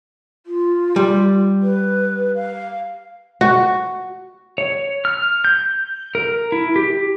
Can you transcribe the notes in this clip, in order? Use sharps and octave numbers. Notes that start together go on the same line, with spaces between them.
F4
G3
B4
F5
F#4
C#5
F6
G6
A#4
E4
G4